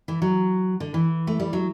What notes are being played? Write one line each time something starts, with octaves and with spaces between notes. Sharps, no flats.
E3
F#3
D3
E3
A3
G3
F#3